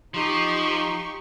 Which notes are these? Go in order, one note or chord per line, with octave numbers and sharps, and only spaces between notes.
F3 D#4 G4 C#6